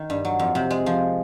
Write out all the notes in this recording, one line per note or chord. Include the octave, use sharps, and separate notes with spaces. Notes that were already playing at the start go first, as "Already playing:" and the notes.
Already playing: D#3
G2
F#3
F2
C3
G#3
F3